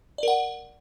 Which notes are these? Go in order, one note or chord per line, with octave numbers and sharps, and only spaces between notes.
A#4 D5 F#5